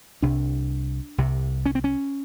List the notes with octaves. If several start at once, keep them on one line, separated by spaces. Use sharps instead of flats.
C2 C3 D4
C2 C3
C#4
C4
C#4